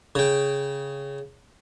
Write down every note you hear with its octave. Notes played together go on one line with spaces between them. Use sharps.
C#3 G5